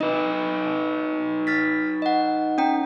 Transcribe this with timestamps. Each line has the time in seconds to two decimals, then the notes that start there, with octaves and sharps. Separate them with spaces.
0.01 D#4 B4 D#5
1.47 F6 A6 B6
2.02 D#5 F#5
2.58 C#4 G5 A#5